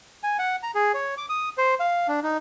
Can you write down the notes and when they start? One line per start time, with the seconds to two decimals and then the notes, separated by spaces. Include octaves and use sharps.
0.23 G#5
0.39 F#5
0.63 A#5
0.75 G#4
0.94 C#5
1.17 D6
1.29 D#6
1.58 C5
1.80 F5
2.08 D4
2.23 D#4